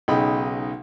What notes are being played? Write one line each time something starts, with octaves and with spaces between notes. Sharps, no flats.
B1 C#3 D#4 D#5 G5 B5